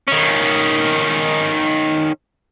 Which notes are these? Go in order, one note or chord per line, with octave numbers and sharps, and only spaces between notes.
D#3 C#4